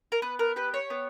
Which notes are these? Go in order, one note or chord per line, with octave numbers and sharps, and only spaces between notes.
A#4
B3 B4
A#4
G4 B4
C#5
B3